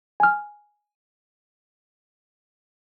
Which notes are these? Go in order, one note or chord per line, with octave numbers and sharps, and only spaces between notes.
G#5 F6